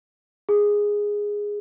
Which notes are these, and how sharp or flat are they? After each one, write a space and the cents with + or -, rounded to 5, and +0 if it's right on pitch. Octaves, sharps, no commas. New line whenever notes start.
G#4 -10